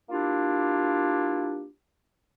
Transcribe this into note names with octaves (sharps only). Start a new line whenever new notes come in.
A#3 D4 E4 F4 G4